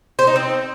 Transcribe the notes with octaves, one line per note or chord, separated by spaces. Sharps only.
C5
D#4
C4